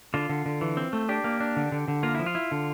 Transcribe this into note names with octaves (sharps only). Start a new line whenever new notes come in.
D3 F4
D3
D3
E3
C4
A3
D4 G4
A#3
D4
D3
D3
D3
A#3 F4
F3 E4
F4
E4
D3